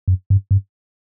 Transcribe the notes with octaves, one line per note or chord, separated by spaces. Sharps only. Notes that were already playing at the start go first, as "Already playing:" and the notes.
F#2
G2
G2